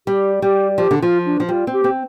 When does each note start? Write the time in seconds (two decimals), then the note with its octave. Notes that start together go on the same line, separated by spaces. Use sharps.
0.07 G3 G4
0.42 G3 G4
0.78 F3 G4
0.91 D3
1.02 F3 F4
1.26 D4
1.40 F3
1.49 G3 F4
1.67 C4
1.73 G4
1.84 C4